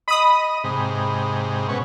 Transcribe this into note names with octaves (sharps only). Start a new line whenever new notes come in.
D#5 B5 D#6
G#2 C3
B2 C#4